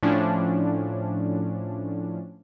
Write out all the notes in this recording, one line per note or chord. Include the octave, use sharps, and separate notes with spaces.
A2 F3 C#4 D4